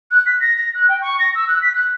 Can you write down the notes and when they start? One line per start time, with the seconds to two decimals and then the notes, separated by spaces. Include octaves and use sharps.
0.11 F#6
0.26 B6
0.40 A#6
0.57 A#6
0.74 F#6
0.89 G5
1.02 C#6
1.19 A#6
1.35 E6
1.48 F#6
1.62 B6
1.75 F#6